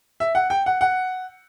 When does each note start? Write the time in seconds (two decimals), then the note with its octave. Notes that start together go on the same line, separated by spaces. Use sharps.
0.20 E5
0.35 F#5
0.50 G5
0.66 F#5
0.81 F#5